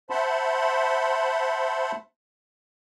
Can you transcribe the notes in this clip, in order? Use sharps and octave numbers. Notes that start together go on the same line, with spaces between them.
C5 E5 F#5 A5 B5 C6